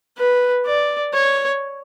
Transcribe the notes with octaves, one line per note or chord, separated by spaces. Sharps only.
B4
D5
C#5